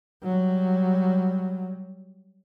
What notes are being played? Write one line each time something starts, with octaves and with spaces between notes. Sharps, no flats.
F#3 G3